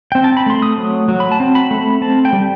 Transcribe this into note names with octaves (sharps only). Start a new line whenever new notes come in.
C4 G5
A5
B5
A3 C6
D#6
F#3
F#3
B5
A5
C4
B5
A3
B5
C4 A5
G5
G3